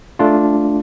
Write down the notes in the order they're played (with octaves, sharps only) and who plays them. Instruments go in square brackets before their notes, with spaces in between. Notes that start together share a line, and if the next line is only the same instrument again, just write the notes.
[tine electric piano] A3 D4 F4